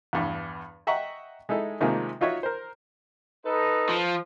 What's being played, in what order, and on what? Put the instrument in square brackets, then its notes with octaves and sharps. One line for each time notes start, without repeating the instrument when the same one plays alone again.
[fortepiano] E2 G2
D#5 E5 F#5 G5 A#5 C#6
G#3 D#4 E4 A4
C3 D#3 F3 G#3 A#3
D#4 F4 F#4 C#5 E5
A#4 C5
[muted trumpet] D#4 [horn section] A4 B4
[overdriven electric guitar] F3